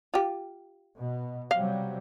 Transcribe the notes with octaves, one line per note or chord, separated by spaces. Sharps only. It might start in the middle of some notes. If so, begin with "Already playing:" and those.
F4 G4
B2
C3 F#3 G3 F5